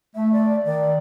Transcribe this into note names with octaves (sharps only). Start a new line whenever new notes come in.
A3 E5
D5
D#3 D5